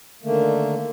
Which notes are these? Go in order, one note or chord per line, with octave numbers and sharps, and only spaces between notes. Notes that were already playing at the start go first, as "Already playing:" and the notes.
D3 D#3 A3 A#3